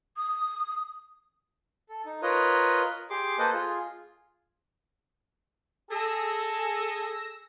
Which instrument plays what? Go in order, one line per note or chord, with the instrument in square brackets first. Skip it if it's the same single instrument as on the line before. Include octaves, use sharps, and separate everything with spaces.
[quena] D#6
[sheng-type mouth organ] A4
D#4
F4 A#4 B4 C#5 D#5
G4 G#4 C6 D6
A#3 A4 B4 C5 D#5
F4 G#4
[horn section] G#4 A4 [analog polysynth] E6 A#6